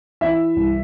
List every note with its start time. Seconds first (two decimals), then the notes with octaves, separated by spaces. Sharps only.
0.21 E3 E5
0.56 C2